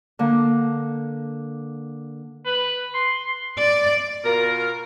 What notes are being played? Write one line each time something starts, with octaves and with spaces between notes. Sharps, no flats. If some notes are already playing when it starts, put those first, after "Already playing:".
D3 A#3
B4
C6
D5
B2 F4 A#4